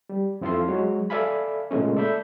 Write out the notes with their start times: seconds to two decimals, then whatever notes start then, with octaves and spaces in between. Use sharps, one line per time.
0.09 G3
0.41 F2 C4 E4 F4 A4 C6
0.68 F#3 G#3 F#4 C#5
1.10 A4 D5 E5 F5 G#5 B5
1.71 A#2 C#3 G#3 A3 C#4
1.96 A4 D5 E5 B5 G6